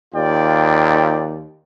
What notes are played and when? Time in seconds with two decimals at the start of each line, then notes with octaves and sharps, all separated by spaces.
0.15 D#2 F4 D5 G5